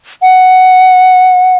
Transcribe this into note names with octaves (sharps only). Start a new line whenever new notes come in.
F#5